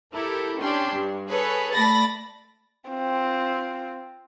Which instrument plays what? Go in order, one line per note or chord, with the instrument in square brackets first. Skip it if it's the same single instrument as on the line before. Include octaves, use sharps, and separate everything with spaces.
[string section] E4 G4 A4 A#4
C#4 D4 G4 G5 C6
G2
G#4 A4 B4 C#5
A3 D5 A5 B5 A6 A#6
[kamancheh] C4 F4